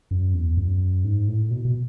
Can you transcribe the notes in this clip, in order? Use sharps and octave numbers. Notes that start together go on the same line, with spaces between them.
F#2
E2
F#2
G#2
A2
B2
B2